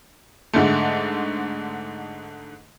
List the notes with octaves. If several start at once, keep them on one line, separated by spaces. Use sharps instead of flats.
G#2 D3 G#3 A3